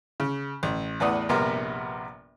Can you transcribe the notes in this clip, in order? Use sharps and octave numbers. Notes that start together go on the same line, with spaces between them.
C#3
A1
E2 A2 B4 D5 F#5 D#6
A#1 G2 C3 A#3 B3 A#4